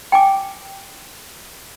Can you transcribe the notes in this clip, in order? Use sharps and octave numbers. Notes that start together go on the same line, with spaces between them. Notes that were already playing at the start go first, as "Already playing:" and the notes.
G5 G#5 D6